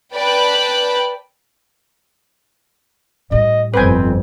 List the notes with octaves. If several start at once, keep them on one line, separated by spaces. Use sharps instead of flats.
B4 D5 G5 A5 B5 F#6
A2 G3 D#5
G1 F2 C4 B4 G5 G#5